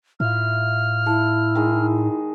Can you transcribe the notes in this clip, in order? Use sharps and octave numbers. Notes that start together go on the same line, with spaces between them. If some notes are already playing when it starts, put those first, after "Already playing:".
A2 E4 F4 F6
E4 A4
D#3 G#3